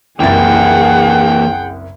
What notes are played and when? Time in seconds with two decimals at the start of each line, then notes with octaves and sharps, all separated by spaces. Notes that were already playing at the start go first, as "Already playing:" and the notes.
0.20 F#1 C2 E3 A#3 G#4 F#5 G5 A6